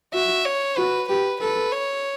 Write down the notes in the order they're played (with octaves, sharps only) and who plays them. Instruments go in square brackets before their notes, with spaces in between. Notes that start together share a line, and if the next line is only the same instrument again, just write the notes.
[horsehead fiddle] F#4 [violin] E5
[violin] C#5
[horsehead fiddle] F#4 [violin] B4
[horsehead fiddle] G4 [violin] B4
[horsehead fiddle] A4 [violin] B4
[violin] C#5